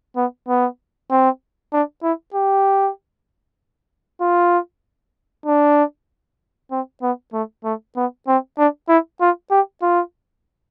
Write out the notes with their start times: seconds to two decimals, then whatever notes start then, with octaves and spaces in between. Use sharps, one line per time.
0.16 B3
0.48 B3
1.10 C4
1.73 D4
2.03 E4
2.34 G4
4.21 F4
5.46 D4
6.71 C4
7.02 B3
7.33 A3
7.64 A3
7.96 B3
8.27 C4
8.58 D4
8.88 E4
9.21 F4
9.51 G4
9.82 F4